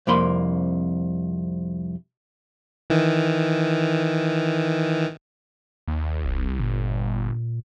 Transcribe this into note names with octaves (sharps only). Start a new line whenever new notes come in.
C2 F2 A#3 B5 C6
D#3 E3
D#2
D1 C2
G1 A#2